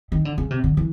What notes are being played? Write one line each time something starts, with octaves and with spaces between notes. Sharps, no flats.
D#3
D3
C#3
C3
D3
E3